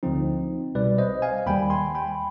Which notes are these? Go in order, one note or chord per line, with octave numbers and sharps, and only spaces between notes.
D2 D3 F3 C4 D#4
C2 B2 G3 B4 D5
C5 D#5
F5 G#5
D#2 D#3 G3 G5 B5
G#5 C6
G5 B5